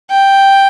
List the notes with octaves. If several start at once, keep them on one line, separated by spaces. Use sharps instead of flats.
G5